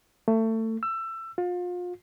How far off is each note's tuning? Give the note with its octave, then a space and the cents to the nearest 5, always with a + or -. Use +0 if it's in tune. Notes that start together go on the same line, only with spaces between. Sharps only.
A3 +25
E6 +20
F4 +30